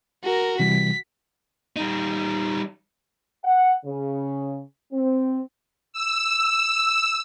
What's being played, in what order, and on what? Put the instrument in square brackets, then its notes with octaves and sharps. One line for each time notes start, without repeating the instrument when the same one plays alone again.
[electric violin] F#4 A#4
[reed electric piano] C3 E3 G3 [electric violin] B6
[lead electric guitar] G3 D#4
[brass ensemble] F#5
C#3
C4
[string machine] E6